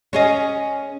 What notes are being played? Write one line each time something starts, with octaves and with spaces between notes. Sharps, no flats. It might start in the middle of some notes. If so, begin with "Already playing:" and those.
C#4 G#4 D#5